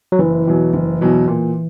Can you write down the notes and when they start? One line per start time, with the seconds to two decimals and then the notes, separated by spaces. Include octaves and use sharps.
0.12 F#3
0.19 F#1 E3
0.47 E2 B2 F#3
0.74 F#1
1.01 E2 B2 F#3
1.28 A#2